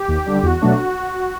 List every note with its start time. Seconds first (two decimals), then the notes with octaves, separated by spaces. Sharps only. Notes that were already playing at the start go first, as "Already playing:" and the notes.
Already playing: G4
0.08 D#2
0.26 D3 G3
0.43 E2 F#4
0.61 B2 F#3 A3 D4